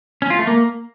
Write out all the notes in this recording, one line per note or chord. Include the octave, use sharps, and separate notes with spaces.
C#4
F4
A3
A#3